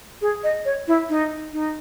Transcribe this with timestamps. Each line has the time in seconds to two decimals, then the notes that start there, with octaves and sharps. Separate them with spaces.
0.22 G#4
0.44 D#5
0.65 C#5
0.88 E4
1.09 D#4
1.53 D#4